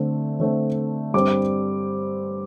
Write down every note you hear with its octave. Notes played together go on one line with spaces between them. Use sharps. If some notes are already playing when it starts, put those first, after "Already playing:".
Already playing: D3 A3 C4
D3 A3 C4
G2 G3 C4 D6